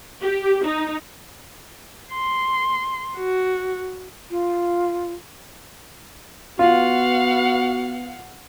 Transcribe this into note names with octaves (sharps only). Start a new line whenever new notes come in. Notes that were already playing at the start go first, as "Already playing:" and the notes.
G4
D#4
C6
F#4
F4
B3 F4 F#4 F5 F#5